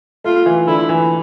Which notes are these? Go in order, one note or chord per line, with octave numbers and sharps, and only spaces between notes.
A3 F4
E3
D3 E4
E3